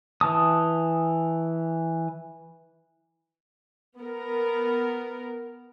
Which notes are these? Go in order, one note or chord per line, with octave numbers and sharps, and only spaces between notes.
E3 A5 D#6
B3 A#4